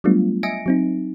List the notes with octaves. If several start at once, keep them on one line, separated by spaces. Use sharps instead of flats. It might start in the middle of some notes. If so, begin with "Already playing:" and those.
F#3 G3 A3 B3 D4 F4
D#5 E5 G#5 A#6 C#7 D7
F#3 C4 D#4